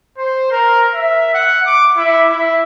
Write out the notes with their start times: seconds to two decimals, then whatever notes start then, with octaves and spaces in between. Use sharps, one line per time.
0.18 C5
0.51 A#4
0.93 E5
1.34 F#5
1.66 D6
1.97 E4
2.31 E4